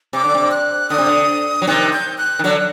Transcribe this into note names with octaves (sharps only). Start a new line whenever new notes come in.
C3 D6
D3
C3
F#6
D3 D#6
C3
D3
F#3
C3 D#3 F#6
G6
F#6
D#3
D3 F#3 F#6